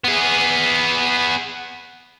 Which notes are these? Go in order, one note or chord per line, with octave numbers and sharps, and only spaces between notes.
B3 G#4